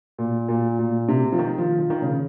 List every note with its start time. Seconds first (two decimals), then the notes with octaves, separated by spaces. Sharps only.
0.18 A#2
0.48 A#2
0.79 A#2
1.09 C3
1.32 F3
1.39 D#3
1.58 F3
1.79 F3
1.90 D#3
2.02 C#3